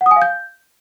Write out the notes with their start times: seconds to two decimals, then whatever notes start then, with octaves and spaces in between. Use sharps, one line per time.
0.01 F#5
0.06 D#6
0.11 G#5
0.16 F5
0.22 G6